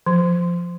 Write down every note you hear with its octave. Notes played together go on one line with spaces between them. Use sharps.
F3